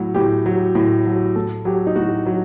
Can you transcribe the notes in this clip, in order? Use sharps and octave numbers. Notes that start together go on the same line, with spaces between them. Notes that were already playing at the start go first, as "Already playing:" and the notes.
Already playing: A2 F#3 F#4
A2 G4
F#3
A2
F#3
A2 A4
F#3 G4
D#4
A2 F#4
F#3